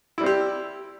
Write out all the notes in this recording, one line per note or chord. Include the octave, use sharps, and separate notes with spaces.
G3 C4 E4 G4